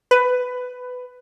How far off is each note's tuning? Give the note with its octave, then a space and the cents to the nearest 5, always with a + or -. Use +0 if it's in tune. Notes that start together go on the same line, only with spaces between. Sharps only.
B4 +15